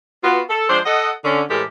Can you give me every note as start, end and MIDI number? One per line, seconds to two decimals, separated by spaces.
0.24 0.40 59
0.24 0.40 65
0.24 0.40 66
0.50 0.68 69
0.70 0.79 53
0.70 0.79 56
0.70 0.79 62
0.70 0.79 72
0.85 1.11 69
0.85 1.11 75
0.85 1.11 78
1.24 1.42 50
1.24 1.42 61
1.50 1.62 45
1.50 1.62 52
1.50 1.62 56
1.50 1.62 67
1.50 1.62 69
1.50 1.62 70